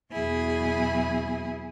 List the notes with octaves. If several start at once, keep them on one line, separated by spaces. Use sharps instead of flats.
E2 B2 F#3 E4 G#4